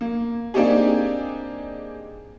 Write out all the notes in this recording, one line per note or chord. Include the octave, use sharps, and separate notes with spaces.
A#3
A#3 C4 D4 D#4 G4 G#4